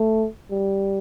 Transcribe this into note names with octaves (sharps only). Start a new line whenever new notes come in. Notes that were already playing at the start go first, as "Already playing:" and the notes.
Already playing: A3
G3